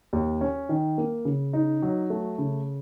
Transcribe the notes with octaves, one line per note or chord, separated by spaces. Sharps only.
D#2
C#4
D#3
A#3
C#3
D#4
F#3
A3
C#3